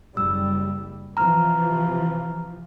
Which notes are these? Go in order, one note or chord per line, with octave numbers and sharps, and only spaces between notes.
F#1 G3 E6
C3 E3 F3 A#5 F6